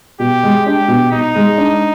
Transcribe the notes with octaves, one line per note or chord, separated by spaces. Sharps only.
B2 G4
G#3
D4 G4
B2
B2 D#4
G#3
D4